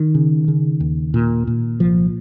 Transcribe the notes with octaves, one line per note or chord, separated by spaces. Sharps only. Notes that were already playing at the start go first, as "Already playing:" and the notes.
Already playing: D#3
C#3
C#3
D#2
A#2
A#2
C2 F3